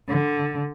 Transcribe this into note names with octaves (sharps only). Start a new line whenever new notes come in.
D3